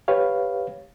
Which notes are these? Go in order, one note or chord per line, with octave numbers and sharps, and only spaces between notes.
G4 B4 C#5 F5